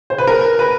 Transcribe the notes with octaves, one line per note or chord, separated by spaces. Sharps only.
C5
B4
A#4
B4